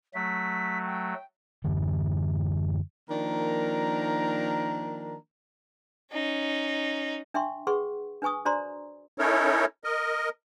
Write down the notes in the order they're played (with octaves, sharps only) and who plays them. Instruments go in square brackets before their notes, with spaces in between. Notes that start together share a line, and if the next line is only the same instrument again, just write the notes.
[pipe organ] F#3 A3 [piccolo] B6
[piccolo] G5
[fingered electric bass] F#2 D3 E3
[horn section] D#3 F3 A#3 D4 A#4 A#5
[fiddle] C#4 D#4
[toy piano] D4 E5 G5 C6 C#6
G#4 B4 F#5 C6 C#6
D4 B4 G#5 C#6 D#6
D4 F#4 C5 D5 A#5 C6
[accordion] C#4 D#4 E4 A4 A#4 C#5
A#4 D#5